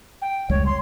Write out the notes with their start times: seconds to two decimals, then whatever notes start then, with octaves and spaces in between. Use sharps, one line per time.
0.21 G5
0.49 F1 C#2 G3 C#5
0.65 C6